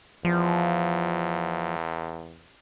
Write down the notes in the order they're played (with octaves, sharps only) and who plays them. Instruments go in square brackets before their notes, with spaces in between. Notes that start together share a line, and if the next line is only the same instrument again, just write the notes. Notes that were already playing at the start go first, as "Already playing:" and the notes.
[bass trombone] E2 [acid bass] F3